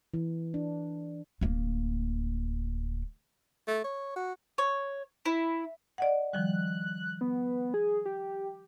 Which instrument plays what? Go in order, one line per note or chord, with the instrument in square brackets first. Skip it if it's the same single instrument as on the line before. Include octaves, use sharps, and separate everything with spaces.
[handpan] E3
D4
[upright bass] D1 A#3
[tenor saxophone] A3
C#5
F#4
[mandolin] C#5
E4
[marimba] D5 D#5 F#5
[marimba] D#3 F3 G3 [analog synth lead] F#6
[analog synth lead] B3
G#4
G4